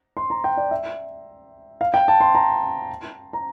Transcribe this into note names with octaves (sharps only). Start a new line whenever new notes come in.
C6
A#5
G5
D5
E5
F5
G5
A5
C6
A#5
A#5